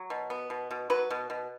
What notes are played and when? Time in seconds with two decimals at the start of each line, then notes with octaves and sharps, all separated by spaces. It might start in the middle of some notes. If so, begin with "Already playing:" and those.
Already playing: F#3
0.10 B2
0.30 B3
0.50 B2
0.71 B2
0.90 F#3 B4
1.10 B2
1.30 B2